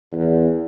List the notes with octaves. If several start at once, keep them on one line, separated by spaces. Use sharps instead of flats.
E2